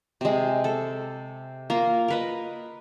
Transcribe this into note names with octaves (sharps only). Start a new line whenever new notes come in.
C3 G#3
A4
A#3 F4 A#4
A#4 B4 D#5